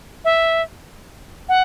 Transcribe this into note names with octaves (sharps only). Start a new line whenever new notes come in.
E5
F#5